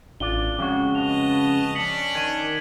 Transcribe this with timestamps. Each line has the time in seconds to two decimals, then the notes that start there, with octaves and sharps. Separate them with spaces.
0.20 A1 D4 F4 D5 G7
0.59 F2 C#3 G#3 F#4
0.95 B4 D#5 A5 F7
1.75 C#4 D4 B6 C#7 F#7
2.15 D#3 G#6 D#7